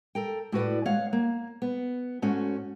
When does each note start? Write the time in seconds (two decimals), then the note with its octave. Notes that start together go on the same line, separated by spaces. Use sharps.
0.15 A4 A#4 G5
0.52 A2 F#4 B4 D5
0.86 G#3 C#5 F5 F#5
1.13 A#3
1.62 B3
2.22 G#2 A3 C#4 F#4